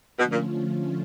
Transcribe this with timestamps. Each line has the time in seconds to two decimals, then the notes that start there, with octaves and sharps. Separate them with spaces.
0.19 B2 D3 F3 A3 C#4 F4
0.32 A#2